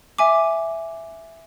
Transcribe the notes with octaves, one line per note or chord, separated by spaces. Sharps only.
E5 G#5 D6